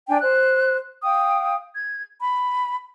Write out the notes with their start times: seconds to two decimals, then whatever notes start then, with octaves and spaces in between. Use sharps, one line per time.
0.09 D4 D5 G5 G#5
0.20 C5 F#6
1.03 F5 G5 D#6
1.74 G#6
2.20 B5